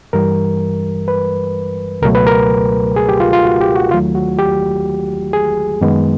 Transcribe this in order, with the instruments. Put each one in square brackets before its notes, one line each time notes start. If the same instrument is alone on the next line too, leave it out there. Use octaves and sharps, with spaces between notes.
[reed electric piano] G2 E3 G3 A#4
B4
C#2 B2 F#3 A3 A#4
B4
A#4
G#4
G4
F4
F4
F#4
G4
F#4
D#2 D#3 F#3 A3 F4
F#4
G4
G#4
F#2 D#3 G#3 B3